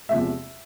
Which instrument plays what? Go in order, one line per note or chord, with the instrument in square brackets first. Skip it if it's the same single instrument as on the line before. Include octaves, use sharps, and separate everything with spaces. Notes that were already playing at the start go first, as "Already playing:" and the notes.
[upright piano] E2 C3 F3 G#3 E5